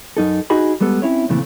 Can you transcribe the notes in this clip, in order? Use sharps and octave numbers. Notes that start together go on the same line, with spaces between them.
F#2 D#4 A4
D4 D#4 F#4 G#4 D#5 B5
G3 G#3 B3 A4
C4 C#4 E4 C#5
F2 A#2 C#3 E3 A3 C4